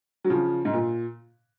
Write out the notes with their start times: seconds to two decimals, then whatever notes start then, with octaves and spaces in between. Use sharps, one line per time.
0.24 F#3
0.30 C#3 F3
0.65 G#2
0.73 A#2